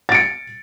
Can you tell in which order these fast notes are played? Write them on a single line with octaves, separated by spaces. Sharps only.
A6 D7 C#7